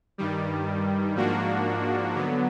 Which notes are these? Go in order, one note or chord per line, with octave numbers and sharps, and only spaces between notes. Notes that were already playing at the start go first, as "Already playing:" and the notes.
G2 D#3 G3
G#2 F3 A#3 D4 F#4
D3 F#3 B3